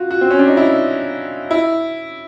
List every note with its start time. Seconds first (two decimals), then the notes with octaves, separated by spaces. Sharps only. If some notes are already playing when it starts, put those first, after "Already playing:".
Already playing: F4 F#4
0.11 F#4
0.21 C4
0.31 C#4
0.39 D4
0.47 D#4
0.57 E4
1.51 E4